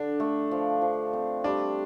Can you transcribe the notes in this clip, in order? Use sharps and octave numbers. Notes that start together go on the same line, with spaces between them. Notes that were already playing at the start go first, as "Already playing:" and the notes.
Already playing: D3 D4
A3
F3
F3
C4
G3 D4